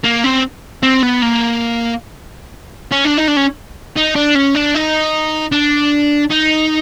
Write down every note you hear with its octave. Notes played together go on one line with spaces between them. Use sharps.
A#3
C4
C4
B3
A#3
C#4
D4
D#4
D4
C#4
D#4
D4
C#4
D4
D#4
D4
D#4